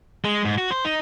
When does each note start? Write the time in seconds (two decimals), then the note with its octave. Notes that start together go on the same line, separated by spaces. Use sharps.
0.25 G#3
0.45 G#2
0.58 F#4
0.71 C5
0.85 D#4